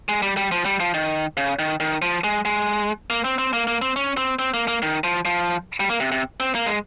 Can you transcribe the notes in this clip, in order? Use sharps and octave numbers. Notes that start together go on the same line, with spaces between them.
G#3
G3
G3
F3
G3
F3
D#3
C#3
D#3
D#3
F3
G#3
G#3
A#3
C4
C4
A#3
A#3
C4
C#4
C4
C4
A#3
A#3
D#3
F3
F3
G3
A#3
C3
C3
C4
A#3
G#3